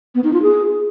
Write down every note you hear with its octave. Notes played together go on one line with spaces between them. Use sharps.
B3
D#4
F4
G#4